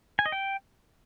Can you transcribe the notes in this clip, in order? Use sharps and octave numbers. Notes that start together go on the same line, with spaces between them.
G#5
D#5
G5